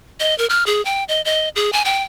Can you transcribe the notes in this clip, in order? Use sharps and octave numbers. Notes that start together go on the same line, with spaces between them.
D#5
A#4
F6
G#4
G5
D#5
D#5
G#4
G#5
G5